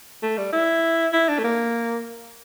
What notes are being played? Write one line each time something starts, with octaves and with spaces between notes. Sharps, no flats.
A3
G3
E4
E4
D4
A3
A#3